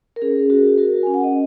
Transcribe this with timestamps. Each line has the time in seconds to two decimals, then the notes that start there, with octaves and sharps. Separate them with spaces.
0.16 A#4
0.22 C#4 G#4
0.50 F#4
0.78 F#4 A#4
1.03 C#4 G#5
1.14 F#5
1.24 D#5